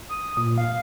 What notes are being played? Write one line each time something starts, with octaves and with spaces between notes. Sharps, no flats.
D#6
A#2
F5